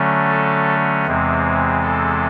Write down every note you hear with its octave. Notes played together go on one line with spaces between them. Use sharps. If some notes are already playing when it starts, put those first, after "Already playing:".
Already playing: D3 F#3 A3 C#4
A4
E2 C3 E3 G#3 C4
A4